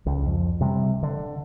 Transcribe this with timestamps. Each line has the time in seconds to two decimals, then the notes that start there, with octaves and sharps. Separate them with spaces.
0.06 C#2
0.26 F2
0.61 C3 G3
1.03 D3